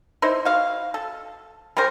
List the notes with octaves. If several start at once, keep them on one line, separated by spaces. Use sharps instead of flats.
D#4 E4 C5
F#4 F5
A4
G3 C#4 A#4 C5